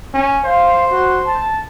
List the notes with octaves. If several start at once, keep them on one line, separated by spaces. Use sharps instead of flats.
C#4
C5 F5
F#4
A5